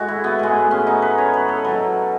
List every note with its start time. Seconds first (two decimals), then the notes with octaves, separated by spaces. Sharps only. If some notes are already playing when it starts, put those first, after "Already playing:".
Already playing: A2 G#3 F#4 G#4
0.08 E4
0.24 B3
0.39 A2 G#3
0.71 C#4
0.87 D#4
1.02 B4
1.18 C#5
1.34 B4
1.48 A4
1.64 B2 F#3 B4